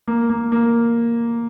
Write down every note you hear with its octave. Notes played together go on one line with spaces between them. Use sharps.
A#3
A#3
A#3